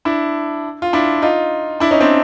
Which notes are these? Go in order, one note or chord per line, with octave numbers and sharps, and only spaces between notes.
D4 E4
F4
D4 E4
D#4 F4
D4 E4
C#4 D#4
C4 D4